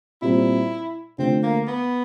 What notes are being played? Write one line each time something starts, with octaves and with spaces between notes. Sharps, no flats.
A#2 G3 C4 E4
D3 F3 A3 C4
A#3
B3